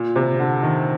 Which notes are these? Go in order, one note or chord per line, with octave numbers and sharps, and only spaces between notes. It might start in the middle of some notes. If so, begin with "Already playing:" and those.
Already playing: A#2
C3
D3
D#3